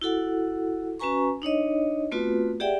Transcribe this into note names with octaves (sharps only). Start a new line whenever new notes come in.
E4 F#4 A4 F#5
C#4 F#4 B4 G#5 A#5 C#6
D4 D#4 C#5 D#5
A3 B3 C4 F4 F#4 B4
G4 G#4 D5 E5 F#5 G5